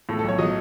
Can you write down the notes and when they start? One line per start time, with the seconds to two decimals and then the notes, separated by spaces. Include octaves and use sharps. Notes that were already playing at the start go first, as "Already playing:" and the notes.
0.09 A2 A4
0.19 A4
0.24 B1 C#5
0.39 F#3 D#5